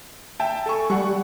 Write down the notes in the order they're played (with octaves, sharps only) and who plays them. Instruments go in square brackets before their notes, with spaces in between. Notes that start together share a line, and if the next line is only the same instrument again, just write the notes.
[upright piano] E5 G5 A5
A4 G#5 C#6
[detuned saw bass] G3 [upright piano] F#5 C#6